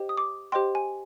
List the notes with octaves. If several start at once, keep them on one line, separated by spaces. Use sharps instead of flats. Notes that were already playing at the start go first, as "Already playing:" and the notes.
Already playing: G4 C5 D#5 G5
D#6
D6
G4 C5 D#5 G5 C6
G#5